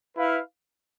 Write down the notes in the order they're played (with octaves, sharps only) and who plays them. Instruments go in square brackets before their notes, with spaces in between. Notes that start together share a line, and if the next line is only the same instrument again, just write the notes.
[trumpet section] E4 B4 F5